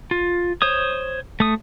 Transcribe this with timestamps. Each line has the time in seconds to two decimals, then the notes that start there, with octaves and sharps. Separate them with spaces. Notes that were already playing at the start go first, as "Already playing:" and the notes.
0.11 F4
0.62 C5 C#5 D#6
1.40 A3 D#6